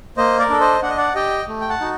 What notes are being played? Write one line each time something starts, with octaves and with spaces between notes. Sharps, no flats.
A#3 C5 D#5
A#4 D5
D4 A4
C5 D#5
D4 F#5
D#5
D5 F#5
G4 D#5 G5
A3
G5
F#5 A5
D#4 F#4